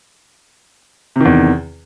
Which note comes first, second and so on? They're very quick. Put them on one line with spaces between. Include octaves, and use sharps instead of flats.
C3 D#3 E2